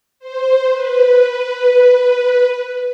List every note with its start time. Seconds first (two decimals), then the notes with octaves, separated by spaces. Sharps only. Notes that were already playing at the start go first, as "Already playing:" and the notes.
0.19 C5
0.68 B4